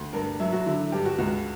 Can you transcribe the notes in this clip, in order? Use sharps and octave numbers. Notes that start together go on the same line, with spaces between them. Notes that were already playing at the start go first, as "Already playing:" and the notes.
Already playing: D2
G2 A#4
F#3 E5
F#4
D3 E4
G2 G4
F#4
C#2 F#4